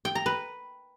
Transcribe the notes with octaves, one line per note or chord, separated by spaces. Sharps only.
G5
A#5
B4